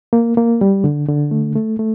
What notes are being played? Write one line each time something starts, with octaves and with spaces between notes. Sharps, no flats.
A#3
A#3
G3
D3
D3
A3
A3
A3